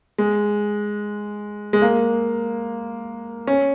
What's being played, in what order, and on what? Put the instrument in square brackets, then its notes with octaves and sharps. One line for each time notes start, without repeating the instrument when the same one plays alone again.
[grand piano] G#3
G#3
A#3
C#4